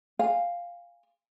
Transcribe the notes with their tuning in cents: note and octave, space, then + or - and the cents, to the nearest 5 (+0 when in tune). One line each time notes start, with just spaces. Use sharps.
F5 +0 G#5 -25